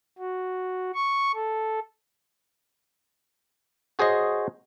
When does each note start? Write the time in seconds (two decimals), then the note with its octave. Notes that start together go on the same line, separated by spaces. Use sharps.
0.18 F#4
0.94 C#6
1.34 A4
3.99 F#4 G#4 C5 C#5 D#5